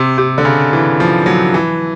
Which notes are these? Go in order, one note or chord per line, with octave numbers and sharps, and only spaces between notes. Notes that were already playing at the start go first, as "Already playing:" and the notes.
Already playing: C3
C3
D3
C#3
E3
F3
F#3
E3